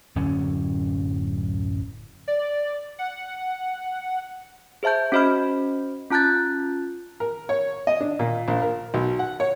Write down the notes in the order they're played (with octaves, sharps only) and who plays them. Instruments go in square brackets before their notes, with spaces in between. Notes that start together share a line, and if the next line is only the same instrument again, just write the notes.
[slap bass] D1 F#2 D3 C#4
[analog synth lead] D5
F#5
[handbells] G#4 C5 E5 A5 G6
C#4 F#4 C5 D#5 B5 F6
C#4 F4 A5 F#6 G6 A6
[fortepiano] A#4
C#5
D#5
D4
A#2
A#1
A#4
B1
F#5
C#5